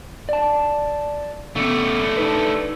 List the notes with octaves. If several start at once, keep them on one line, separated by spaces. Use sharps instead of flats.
D5 A5
C#3 A3 B3 G4
D4 D#4 B4